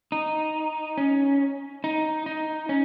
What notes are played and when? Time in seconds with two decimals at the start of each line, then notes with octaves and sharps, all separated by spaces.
0.12 D#4
0.98 C#4
1.84 D#4
2.26 D#4
2.69 C#4